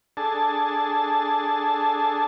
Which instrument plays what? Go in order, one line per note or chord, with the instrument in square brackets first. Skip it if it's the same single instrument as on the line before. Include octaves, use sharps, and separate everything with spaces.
[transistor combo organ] D4 G#4 A4 A5